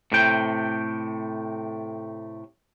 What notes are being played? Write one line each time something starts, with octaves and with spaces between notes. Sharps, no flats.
A2 C3 G5